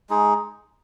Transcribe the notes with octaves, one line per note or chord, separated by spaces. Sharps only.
G#3 D#4 G#4